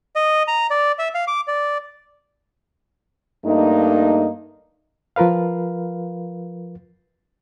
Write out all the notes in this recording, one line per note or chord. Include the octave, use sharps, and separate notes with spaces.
D#5
A#5
D5
E5
F5
D6
D5
G2 A3 A#3 D#4
F3 F4 A#4 B4 F5